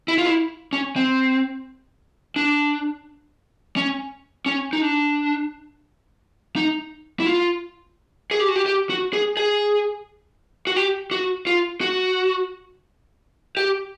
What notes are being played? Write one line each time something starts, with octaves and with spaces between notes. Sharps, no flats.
E4
F4
E4
C#4
C4
D4
C#4
C#4
D#4
D4
D#4
E4
F4
G#4
G4
F#4
G4
G4
F#4
G#4
G#4
F#4
G4
F#4
F4
F#4
G4